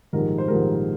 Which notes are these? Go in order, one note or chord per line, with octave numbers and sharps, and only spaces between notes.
A#1 G#2 D#3 G3 A#4
C5
A#1 G#2 D#3 G3 A#4